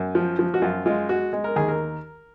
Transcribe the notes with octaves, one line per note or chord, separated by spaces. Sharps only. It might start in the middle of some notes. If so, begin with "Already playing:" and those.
Already playing: F#2
F3
F3
F#4
F#2 F4
G#3 F4
G#3 F#4
G#3
A#4
D#2 G#4
A#4